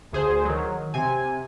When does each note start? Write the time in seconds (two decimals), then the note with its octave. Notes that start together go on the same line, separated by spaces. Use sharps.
0.13 D2 G#4 C5
0.45 D#3 F#3
0.94 C3 G#5